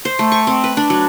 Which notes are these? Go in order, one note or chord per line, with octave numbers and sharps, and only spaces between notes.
C5
A3
C#6
C4
B4
D4
F#3